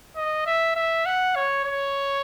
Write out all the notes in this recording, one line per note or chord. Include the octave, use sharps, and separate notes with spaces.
D#5
E5
E5
F#5
C#5
C#5